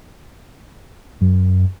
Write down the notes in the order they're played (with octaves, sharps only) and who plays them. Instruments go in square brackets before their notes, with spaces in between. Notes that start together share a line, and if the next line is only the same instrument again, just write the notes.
[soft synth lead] F#2